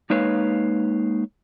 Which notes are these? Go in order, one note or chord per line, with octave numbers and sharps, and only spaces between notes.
G#3 A#3 D#4 B4 C#5 F5